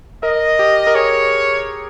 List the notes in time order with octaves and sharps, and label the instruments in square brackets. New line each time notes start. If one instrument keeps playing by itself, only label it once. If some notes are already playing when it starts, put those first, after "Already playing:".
[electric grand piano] A#4 [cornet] D#5
[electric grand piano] G4
A#4
[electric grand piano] G#4 [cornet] C#5